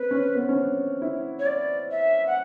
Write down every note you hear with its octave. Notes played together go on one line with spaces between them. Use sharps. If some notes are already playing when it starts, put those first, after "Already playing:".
Already playing: C4 B4
C#4
B3
C4
C#4
D4
E4
C#5
D5
E5
F#5